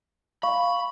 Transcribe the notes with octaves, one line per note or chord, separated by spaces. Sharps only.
F5 B5 C#6